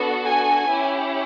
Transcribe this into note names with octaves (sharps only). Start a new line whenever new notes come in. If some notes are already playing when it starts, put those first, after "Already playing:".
Already playing: B3 D4 F#4 A4
G#5
C#4 E4 G4